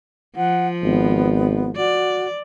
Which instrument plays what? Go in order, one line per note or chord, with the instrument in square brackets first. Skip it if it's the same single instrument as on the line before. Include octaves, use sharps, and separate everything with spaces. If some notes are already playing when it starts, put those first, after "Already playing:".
[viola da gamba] F3 [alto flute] F#5
[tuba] G#1 [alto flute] B3
[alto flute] F#4 [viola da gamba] D5